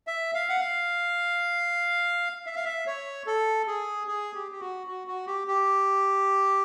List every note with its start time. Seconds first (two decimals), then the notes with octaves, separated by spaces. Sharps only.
0.07 E5
0.34 F5
0.49 F#5
0.60 F5
2.46 E5
2.56 F5
2.65 E5
2.87 C#5
3.26 A4
3.67 G#4
4.08 G#4
4.34 G4
4.52 G4
4.60 F#4
4.87 F#4
5.07 F#4
5.27 G4
5.48 G4